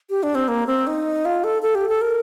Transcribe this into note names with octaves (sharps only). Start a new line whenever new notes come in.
G4
D4
C4
A#3
C4
D#4
F4
A4
A4
G4
A4
A#4